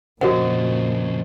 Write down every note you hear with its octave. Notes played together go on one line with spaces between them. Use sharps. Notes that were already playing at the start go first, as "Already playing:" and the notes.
F2 A#2 C#3 F#4 A#4 C5 D#5 F#5